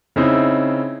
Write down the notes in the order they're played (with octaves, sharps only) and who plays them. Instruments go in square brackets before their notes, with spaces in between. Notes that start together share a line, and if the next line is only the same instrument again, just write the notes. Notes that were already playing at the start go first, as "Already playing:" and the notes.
[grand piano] C#3 C4 D#4 E4